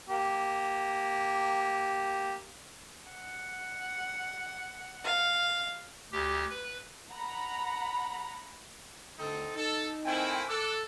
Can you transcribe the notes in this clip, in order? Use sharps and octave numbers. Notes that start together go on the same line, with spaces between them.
A#3 G4
F#5
F5
D2 G4
B4
F#5 A#5 B5
D2 C4 D#4 A4
D#4 A4
A3 A#3 C4 E4 G5 G#5
A4 D6 E6 F#6